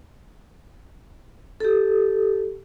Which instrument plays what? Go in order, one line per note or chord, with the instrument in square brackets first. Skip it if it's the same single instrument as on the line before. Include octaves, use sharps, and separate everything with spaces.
[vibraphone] G4 A4